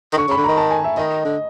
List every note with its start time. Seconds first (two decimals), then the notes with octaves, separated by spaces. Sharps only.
0.13 D#3
0.17 D3 C#6
0.28 C#3
0.31 B5
0.37 D3
0.44 D#3 A#5
0.57 A5
0.71 G#5
0.84 E5
0.97 D#3 D#5
1.25 D3